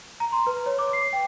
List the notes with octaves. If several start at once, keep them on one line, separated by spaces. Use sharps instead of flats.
A#5
C6
B4
C#5
D6
C7
G5